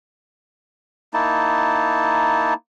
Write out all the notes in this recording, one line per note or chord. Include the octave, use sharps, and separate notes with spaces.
A#3 D#4 E4 A5